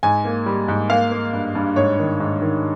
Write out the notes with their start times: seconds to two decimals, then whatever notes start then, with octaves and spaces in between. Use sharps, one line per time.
0.03 G#2 G#5
0.25 A#3
0.46 G3
0.68 G#2
0.90 A#3 F5
1.11 A#3
1.33 G2
1.55 G2
1.76 G#2 C#5
1.99 D#3
2.20 G#2
2.42 D#3